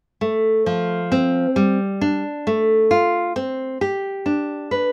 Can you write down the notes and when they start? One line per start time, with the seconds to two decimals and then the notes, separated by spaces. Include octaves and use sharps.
0.21 A3
0.66 F3
1.12 C4
1.56 G3
2.01 D4
2.47 A3
2.91 F4
3.36 C4
3.81 G4
4.26 D4
4.71 B4